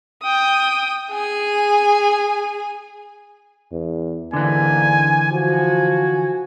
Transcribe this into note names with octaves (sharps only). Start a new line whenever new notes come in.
G5 D#6
G#4 G#5
E2
D#2 G#2 D3 E3 A#3 D4 G#5
F3 F#4 G#5